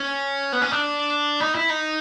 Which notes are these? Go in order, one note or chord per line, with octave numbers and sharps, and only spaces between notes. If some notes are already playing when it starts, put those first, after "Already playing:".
Already playing: C#4
B3
C#4
D4
D#4
E4
D#4